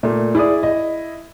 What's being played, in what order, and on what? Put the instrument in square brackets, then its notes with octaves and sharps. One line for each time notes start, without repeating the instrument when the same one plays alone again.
[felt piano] A#2 A3
[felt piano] E4 [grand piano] G#4 D5 D#6
[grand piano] D#5